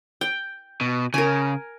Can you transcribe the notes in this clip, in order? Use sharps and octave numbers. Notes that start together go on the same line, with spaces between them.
G5
B2
C#3 A#4 G#5